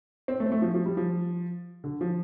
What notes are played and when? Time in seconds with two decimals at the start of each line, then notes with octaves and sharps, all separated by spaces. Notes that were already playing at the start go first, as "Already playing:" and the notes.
0.28 C4
0.40 A3
0.46 C4
0.52 A3
0.62 F3
0.74 F3
0.86 G3
0.97 F3
1.84 D3
2.01 F3